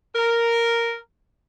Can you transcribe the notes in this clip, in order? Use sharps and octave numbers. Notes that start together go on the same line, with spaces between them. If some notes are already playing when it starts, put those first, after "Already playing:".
A#4